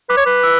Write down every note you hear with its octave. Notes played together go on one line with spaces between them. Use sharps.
B4 D6
C#5
B4
E6